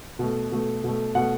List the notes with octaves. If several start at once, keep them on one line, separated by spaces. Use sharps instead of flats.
B2 A3
B2 A3
B2 A3
B2 A3 F#5